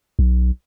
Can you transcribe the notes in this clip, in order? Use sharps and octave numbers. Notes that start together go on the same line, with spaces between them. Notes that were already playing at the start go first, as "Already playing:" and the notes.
B1